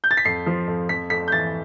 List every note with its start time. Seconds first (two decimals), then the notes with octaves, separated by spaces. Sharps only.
0.04 G6
0.11 A6
0.17 B6
0.25 F2 C7
0.46 F3
0.68 F2
0.89 F2 B6
1.10 F2 B6
1.28 G6
1.32 E3 A6